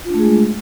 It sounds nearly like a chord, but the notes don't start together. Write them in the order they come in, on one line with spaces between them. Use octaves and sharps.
F4 D4 A3 G#4 G#3